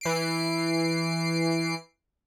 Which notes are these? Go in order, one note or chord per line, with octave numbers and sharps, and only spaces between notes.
E3 C7 D7